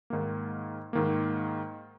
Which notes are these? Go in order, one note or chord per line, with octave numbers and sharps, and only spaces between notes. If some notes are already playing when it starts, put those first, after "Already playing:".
G#2 D#3 A#3
G#2 D#3 A#3